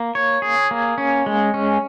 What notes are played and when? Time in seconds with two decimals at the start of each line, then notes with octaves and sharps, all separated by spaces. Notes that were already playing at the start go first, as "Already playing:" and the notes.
Already playing: A#3
0.15 C#5
0.42 G#4
0.71 A#3
0.98 C#4
1.26 G#3
1.54 C#4